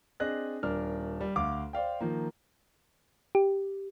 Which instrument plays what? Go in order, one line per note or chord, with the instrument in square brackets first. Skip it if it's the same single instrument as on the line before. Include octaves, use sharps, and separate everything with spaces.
[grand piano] C4 D4 G#4 D#5 F#6 A#6
D#1 D4 A#4 F6
G3
D2 F5 D6
C5 D5 F5 G5
D#3 F3 A#3
[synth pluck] G4